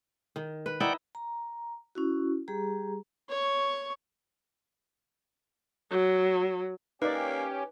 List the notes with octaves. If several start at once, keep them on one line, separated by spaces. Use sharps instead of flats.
D#3
B4
D#4 E4 D5 E5 F#5 G5
A#5
C#4 E4 F#4
G3 G4 G#4 A#5
C#5 C#6
F#3
A#3 C#4 D#4 G4 B4 D5